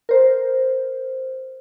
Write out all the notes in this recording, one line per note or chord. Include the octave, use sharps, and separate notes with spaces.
A#4 C5